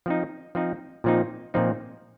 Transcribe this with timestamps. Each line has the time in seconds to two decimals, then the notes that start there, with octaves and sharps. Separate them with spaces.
0.06 F3 C4 D#4
0.55 F3 C4 D#4
1.04 A#2 F3 C4 D#4
1.54 A#2 F3 C4 D#4